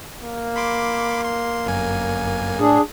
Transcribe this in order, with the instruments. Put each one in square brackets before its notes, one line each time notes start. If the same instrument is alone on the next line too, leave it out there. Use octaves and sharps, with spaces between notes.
[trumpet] A#3
[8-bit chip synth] B5 C6 D6
C6
G1 F#2 G#5
[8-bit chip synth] A2 [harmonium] D4 G#4